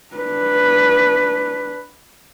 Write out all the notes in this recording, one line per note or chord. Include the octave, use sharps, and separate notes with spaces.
D4 B4